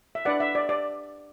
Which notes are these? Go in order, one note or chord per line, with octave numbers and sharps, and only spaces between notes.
E5
D4 B4 D5 F#5
E5
D5
D5